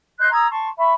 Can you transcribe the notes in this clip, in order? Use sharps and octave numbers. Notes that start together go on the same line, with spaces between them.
D#5 C6 F#6 G6
A#5 D#6 E6 G#6
A5 C6 C#6
E5 B5 C#6